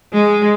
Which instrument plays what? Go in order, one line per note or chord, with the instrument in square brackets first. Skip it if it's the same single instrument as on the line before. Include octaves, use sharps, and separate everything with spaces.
[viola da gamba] G#3